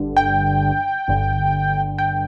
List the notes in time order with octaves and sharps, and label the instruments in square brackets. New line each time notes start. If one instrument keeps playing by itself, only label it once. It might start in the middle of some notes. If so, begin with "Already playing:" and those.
Already playing: [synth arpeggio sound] G1 G2 D3
G5
G1 G2 D3
G5